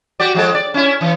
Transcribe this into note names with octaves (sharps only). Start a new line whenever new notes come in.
F#4 G4 D5
F3 G#3 A4
D5
C#4 E4
E3